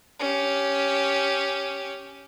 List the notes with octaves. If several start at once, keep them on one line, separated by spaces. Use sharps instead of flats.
C#4 G4